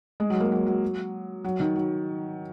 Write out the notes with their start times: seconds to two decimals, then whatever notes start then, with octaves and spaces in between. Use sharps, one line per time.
0.20 G#3
0.30 F#3
0.40 A#3
0.52 F#3
0.67 F#3
1.44 F#3
1.60 D#3
1.75 F#3